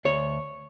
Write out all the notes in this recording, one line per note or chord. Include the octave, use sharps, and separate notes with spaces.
D2 C#5